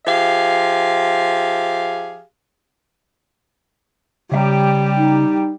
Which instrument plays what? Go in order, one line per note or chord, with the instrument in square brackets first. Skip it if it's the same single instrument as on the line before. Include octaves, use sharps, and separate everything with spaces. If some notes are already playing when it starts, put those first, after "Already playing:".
[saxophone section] F3 G4 G#4 E5 F5
[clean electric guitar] C#3 E5 A#5 [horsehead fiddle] G3 G4
[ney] D#4